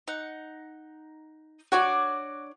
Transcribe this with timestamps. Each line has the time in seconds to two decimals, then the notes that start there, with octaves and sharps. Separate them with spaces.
0.08 D#4 F#5
1.72 D4 F#4 C#5 D5